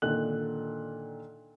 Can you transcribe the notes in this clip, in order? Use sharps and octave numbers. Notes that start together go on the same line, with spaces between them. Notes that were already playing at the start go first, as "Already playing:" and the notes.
A#2 D3 D#3 A4 F#6 F#7